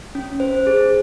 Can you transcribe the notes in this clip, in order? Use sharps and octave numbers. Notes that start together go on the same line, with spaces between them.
C#4
C5
G#4